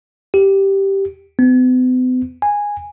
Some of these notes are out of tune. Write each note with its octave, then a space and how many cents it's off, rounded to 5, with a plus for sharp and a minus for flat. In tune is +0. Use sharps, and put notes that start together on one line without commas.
G4 -5
B3 +45
G#5 -10